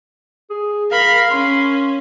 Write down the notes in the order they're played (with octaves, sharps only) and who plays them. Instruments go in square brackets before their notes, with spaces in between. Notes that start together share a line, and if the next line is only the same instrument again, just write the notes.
[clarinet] G#4
[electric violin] A#4 B5 [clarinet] F5
[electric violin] C#4 [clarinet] C6